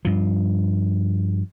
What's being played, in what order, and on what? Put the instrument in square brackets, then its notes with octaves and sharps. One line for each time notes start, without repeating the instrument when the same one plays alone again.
[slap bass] G2 F3